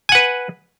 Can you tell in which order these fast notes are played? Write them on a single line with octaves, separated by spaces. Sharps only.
G#5 F#5 B4